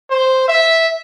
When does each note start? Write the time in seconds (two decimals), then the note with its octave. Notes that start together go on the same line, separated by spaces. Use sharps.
0.10 C5
0.48 E5